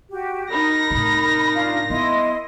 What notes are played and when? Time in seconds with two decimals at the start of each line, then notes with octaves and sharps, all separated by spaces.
0.11 F#4 G4
0.51 D#4 A#4 B5 A#6
0.91 A2 C3
1.54 D4 F4 F5
1.90 B3 E4 D#5 C6